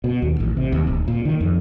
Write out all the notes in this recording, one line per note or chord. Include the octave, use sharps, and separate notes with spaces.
B2
D#2
A1
C3
D#2
D1
A#2
D#3
F2